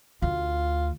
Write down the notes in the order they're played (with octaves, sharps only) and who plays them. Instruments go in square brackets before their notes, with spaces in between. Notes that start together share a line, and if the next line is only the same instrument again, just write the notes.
[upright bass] D2 [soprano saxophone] F4